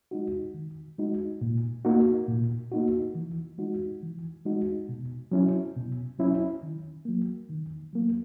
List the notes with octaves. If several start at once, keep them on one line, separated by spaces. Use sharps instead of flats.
G#3 D#4 F#4
D#3
G#3 D#4 F#4
A#2
A#3 D#4 F#4
A#2
A#3 D#4 F#4
E3
G#3 D#4 F#4
E3
G#3 D#4 F#4
B2
F#3 C#4 E4
B2
F#3 C#4 E4
D#3
F#3 A#3
D#3
F#3 A#3